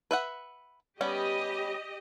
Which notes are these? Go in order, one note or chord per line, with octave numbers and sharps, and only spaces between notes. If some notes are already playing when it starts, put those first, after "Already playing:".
B4 E5 F#5
G3 B3 C#4 G4 D#5